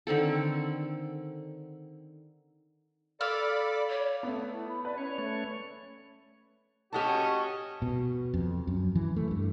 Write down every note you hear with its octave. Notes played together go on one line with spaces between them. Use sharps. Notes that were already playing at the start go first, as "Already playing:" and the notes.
D3 D#3 C4 A4
A4 D5 F5 B5 D6 E6
C#5
A3 B3
E4
B5
B4 D5
C#4 C#5
A3 C#5
C#4 F#4 G4 D#5 F#5 A5
B2
F2
F#2
E3
A3
G2